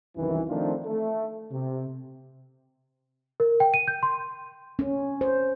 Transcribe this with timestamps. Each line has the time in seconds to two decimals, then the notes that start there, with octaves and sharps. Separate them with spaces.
0.16 C2 F#2 D#3 E3
0.48 D#3 F3 A3 C4 D4 F4
0.85 A3
1.51 C3
3.40 A#4
3.60 G5
3.74 D#7
3.88 G6
4.03 C6
4.79 C#4
5.21 C5